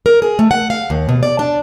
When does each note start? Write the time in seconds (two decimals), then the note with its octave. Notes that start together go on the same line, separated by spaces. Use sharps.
0.06 A#4
0.22 G#4
0.39 A3
0.51 F#5
0.70 F5
0.90 D#2
1.09 B2
1.23 D5
1.39 D4